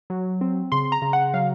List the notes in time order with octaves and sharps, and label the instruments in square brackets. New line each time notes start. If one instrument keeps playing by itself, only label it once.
[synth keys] F#3
C4
C#3 C6
A#5
C#3
F#5
F#3 F5